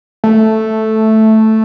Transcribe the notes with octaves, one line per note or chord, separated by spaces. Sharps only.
A3